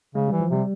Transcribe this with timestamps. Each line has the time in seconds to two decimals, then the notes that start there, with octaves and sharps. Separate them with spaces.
0.15 C#3 G#3
0.28 E3 G3
0.40 F3
0.50 C3 G3